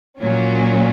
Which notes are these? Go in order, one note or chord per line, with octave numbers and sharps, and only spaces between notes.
A#2 F#3 C#4